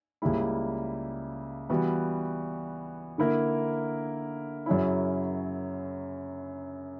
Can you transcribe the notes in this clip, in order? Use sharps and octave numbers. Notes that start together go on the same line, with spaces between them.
C#2 C#3 G3 A#3 E4
E3 G3 B3 F#4
D3 A#3 E4 A#4
F#2 C#3 F#3 C#4 E4